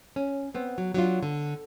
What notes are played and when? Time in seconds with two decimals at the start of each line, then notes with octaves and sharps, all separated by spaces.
0.16 C#4
0.54 B3 C4
0.78 F#3
0.94 F#3 D4 F4
1.23 D3